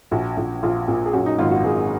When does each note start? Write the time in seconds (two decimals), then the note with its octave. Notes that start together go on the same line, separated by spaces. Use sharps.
0.11 A#1 F#4
0.37 A#1
0.63 A#1 F4
0.88 A#2
1.06 G#4
1.13 F#2 F#4
1.26 D#4
1.38 G#1 F4
1.51 F#4
1.64 G#1 G#4